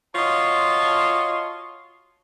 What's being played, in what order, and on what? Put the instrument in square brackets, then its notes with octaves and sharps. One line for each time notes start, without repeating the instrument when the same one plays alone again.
[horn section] F4 F#4 C#5 D#5 A5 C6